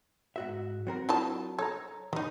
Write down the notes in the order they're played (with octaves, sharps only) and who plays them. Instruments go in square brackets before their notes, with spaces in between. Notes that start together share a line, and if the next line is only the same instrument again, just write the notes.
[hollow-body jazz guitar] G#2 F#4 E5
F#3 C4 A#4
[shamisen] E4 F4 A5
[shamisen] A4 [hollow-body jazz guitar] C#5 A#5
[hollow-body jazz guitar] D#3 [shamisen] G3 D#4